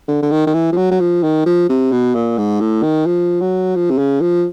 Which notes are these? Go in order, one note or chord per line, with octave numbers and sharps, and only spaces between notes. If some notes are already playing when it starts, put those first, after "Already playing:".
D3
D3
D#3
D#3
E3
F3
F#3
F#3
F3
D#3
F3
C3
B2
A#2
G#2
A2
D#3
F3
F#3
F3
C3
C#3
F3